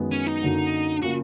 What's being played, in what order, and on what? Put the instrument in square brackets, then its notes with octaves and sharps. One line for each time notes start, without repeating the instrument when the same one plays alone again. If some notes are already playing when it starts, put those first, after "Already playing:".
Already playing: [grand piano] F#2 D#3 G#3 B3
[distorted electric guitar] C#4
D#4
[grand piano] F#2 D3 F#3 A#3
[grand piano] C#3 F3 A#3 [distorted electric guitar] F#4